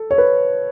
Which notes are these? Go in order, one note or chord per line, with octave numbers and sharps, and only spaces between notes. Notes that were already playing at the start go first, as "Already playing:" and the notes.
Already playing: A4
C#5
B4